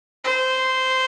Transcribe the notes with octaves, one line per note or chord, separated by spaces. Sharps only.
C5